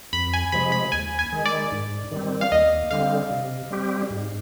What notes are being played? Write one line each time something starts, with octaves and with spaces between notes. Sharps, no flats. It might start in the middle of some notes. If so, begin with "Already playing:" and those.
F2 B5
G#5
C3 F3 G#3 B5
B5
D#2 G#5
G#5
D#3 G#3
D5
G#2
D#3 G3 C4
F5
D#2 D#5
D3 G3 C4 F5
C3
G3 C4 G4
G#2